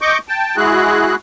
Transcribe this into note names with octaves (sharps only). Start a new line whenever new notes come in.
D#5 C#6 D6 G6
G5 A5
G#3 E4 F#4 G#4 F#6